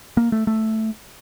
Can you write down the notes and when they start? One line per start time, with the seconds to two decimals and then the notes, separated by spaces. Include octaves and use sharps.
0.17 A#3
0.32 A3
0.47 A3